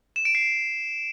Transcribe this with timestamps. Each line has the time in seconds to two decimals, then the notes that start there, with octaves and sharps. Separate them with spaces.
0.16 E7
0.25 D7
0.35 C7